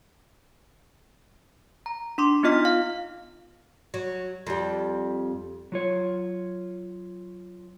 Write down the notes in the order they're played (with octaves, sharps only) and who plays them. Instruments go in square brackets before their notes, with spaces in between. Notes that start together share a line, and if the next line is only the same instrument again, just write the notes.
[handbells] A#5
D4 C6 D6
B3 D#4 F4 D#5 F6 B6
F5
[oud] F#3
F2 G3
[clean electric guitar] F#3 F4 C#5